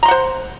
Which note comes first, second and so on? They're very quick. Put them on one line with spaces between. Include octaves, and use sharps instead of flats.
A#5 C6 F#5 C5